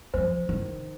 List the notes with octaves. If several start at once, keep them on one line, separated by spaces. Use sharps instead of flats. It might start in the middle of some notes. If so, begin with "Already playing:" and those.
F3 C5
D#3